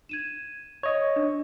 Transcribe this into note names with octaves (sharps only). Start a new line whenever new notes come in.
G#6 D#7 E7
C#5 D#5
D4